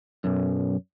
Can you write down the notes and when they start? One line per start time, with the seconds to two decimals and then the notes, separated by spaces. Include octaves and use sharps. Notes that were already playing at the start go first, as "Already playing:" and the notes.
0.24 B1 F#2